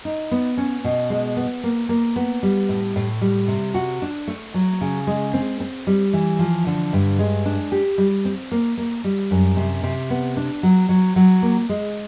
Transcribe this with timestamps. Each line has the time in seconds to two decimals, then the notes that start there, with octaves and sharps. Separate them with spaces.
0.05 D#4
0.31 B3
0.57 C#4
0.84 B2
1.10 G#3
1.37 B3
1.63 A#3
1.89 A#3
2.16 B3
2.43 G3
2.69 A2
2.96 A2
3.21 G3
3.48 C3
3.74 F#4
4.02 D4
4.27 A3
4.54 F#3
4.81 C#3
5.07 G#3
5.33 C4
5.60 C4
5.87 G3
6.13 E3
6.39 F3
6.67 D3
6.93 G2
7.19 G#3
7.46 D4
7.72 G4
7.98 G3
8.25 C4
8.51 A#3
8.77 A#3
9.04 G3
9.31 F#2
9.57 C3
9.83 C3
10.10 B3
10.37 D4
10.63 F#3
10.89 F#3
11.16 F#3
11.42 A#3
11.69 G#3